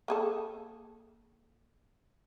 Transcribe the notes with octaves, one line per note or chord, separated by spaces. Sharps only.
A#3 G#4 A4